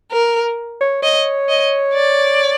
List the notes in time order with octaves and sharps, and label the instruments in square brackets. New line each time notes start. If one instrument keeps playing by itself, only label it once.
[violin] A#4
[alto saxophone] C#5
[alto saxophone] C#5 [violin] D#5
[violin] D#5
D5